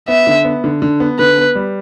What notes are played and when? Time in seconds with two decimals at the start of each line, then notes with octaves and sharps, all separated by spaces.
0.08 B3 E5
0.27 D3
0.45 B3
0.64 D3
0.82 D3
1.00 B3
1.19 D3 B4
1.37 B3
1.55 G3